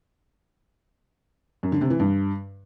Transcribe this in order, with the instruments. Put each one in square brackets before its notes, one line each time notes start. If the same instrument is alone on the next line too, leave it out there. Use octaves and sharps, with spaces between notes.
[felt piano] F#2
D3
C3
E3
G2